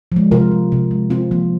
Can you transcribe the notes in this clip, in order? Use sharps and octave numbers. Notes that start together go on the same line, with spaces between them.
F3 G#3
C3 F4 A#4
G#3
C3
G#3
C3 C4 F4
F3 A#3